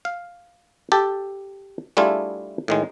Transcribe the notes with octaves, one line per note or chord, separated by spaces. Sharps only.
F5
G4 A4 A5
G3 A3 D4 E4 F4 G#4
A2 D#3 G#3